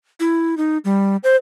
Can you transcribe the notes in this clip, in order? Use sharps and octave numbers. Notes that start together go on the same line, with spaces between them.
E4
D#4
G3
C5